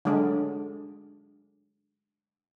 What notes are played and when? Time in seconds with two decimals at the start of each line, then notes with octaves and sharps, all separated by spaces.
0.05 D3 F#3 G#3 D4